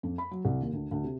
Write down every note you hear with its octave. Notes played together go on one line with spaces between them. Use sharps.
F2
B5
F#3
C2
D#2
D2
D2
C3